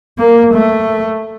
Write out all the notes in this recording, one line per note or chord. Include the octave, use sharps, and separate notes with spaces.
A#3
A3